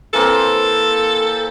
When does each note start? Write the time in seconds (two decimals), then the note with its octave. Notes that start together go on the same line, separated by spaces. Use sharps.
0.14 E3 A#3 C4 A4